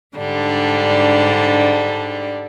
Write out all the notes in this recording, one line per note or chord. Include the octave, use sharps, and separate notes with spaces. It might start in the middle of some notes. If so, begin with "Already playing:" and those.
G#2 D3 G3 D4